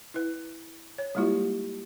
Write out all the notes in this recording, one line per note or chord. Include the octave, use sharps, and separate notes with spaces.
E4 B4
C#5
G3 G#3 A#3 E4 F4 G4